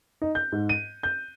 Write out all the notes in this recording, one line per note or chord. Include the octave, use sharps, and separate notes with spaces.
D#4
G6
G#2
D#7
G6